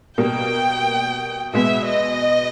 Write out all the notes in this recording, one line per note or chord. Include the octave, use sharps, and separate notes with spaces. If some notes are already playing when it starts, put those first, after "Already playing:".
B2 G3 A#3 G5
B2 G#3 B3 E5
D#5